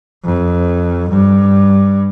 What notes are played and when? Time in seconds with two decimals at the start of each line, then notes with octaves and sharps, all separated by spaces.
0.25 F2
1.10 G2